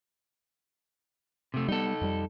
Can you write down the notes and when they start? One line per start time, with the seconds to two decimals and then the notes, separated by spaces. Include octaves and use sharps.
1.54 C3 A3
1.68 G3 B3 D#4 A4
2.01 F2 G3